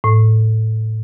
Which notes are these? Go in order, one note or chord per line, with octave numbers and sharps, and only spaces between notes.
A2